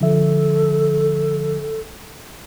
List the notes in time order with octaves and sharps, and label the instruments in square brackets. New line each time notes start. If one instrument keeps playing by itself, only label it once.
[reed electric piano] D3 F3 E5 [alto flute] A4